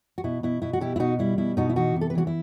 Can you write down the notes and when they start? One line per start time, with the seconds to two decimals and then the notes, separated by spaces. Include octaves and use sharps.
0.18 F#4
0.24 B2 E4
0.43 B2 E4
0.62 B2 E4
0.73 F#4
0.81 B2 E4 G4
0.96 E4
1.00 B2 D#4 F#4
1.19 G3 E4
1.38 B2 E4
1.57 B2 D#4 F#4
1.69 E4
1.76 E3 D#4 F#4
1.96 C3
2.01 A4
2.10 B4
2.15 E3 F#4 A4
2.27 E4